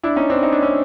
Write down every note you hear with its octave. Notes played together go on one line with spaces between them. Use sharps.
D4 E4
C#4 D#4
C4 D4
D#4
D4
C#4